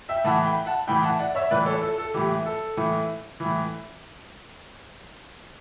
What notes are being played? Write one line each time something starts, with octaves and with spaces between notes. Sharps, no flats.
E5 G5
A2 E3 F#5 A5
G5 B5
F#5 A5
A2 E3 G5 B5
F#5 A5
D5 F#5
C#5 E5
A2 E3 B4 D5
A4 C#5
A4
A4
A2 E3 G4
A4
A2 E3
E3
A2